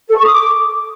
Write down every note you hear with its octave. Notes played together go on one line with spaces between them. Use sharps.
A4
C#6
D#6
D6